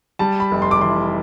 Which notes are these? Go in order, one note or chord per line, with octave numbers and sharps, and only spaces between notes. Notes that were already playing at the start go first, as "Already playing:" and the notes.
G3 A5
B5
F1
C6
D6
E3 C6